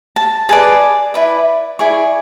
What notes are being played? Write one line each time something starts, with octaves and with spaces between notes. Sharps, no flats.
A5
G#4 B4 D5 A5
E4 B4 D5
E4 G#4 D5 C#6